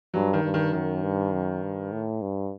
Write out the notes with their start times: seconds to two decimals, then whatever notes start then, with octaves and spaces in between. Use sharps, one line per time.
0.14 G2 F#3
0.33 D#3
0.44 G2
0.54 D#3
0.73 F#2 D#3
1.03 G2
1.32 F#2
1.62 G2
1.92 A2
2.22 G2